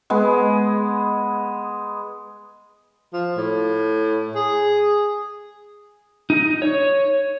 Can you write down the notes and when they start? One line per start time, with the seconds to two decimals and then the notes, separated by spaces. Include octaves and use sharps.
0.10 G#3 B3 G#4
3.13 F3
3.37 A2
4.35 G#4
6.30 D#4
6.62 C#5